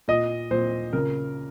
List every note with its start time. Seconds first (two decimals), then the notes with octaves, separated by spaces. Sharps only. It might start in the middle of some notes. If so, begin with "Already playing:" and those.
0.08 A#2 D#5
0.51 A#2 C5
0.93 C#3 A#4